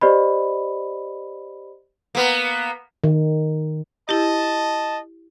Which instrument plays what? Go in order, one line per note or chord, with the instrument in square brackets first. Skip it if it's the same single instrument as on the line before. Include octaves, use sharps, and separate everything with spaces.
[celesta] G4 C5 D5 D#5 B5
[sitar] A#3 B3
[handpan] D#3
[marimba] E4 G4 [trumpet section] D#5 A5